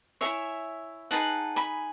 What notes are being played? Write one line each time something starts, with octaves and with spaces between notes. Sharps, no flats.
E4 G#4 C#5 E5 G#5
D#4 G#4 B4 F#5 A5
G#5 B5